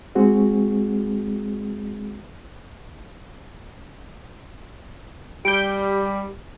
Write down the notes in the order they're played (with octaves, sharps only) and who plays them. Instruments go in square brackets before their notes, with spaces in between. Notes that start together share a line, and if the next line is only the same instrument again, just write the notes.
[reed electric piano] G#3 C4 F#4 G#4
[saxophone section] G3 [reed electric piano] G4 [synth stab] G6 D7